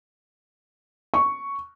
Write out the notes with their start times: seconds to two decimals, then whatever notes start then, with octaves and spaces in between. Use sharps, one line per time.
1.14 C#6